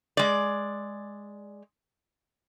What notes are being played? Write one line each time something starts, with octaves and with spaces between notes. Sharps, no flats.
G#3 D5